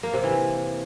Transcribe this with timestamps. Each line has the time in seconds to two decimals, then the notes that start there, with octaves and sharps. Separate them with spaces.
0.03 A#3
0.13 C3
0.24 E3